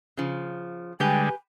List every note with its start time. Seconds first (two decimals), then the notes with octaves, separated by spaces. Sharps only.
0.17 C#3 F3
1.00 D3 G3 G#3 G4 B4 G5 G#5